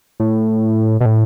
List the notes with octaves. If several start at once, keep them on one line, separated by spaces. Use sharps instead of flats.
A2
B2
A2